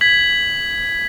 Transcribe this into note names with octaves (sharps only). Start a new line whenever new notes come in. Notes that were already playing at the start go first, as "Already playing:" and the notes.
G#6 B6 F#7